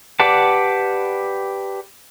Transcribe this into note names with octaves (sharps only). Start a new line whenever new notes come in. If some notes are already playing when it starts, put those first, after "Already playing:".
G4 B4 D5 F#5 A5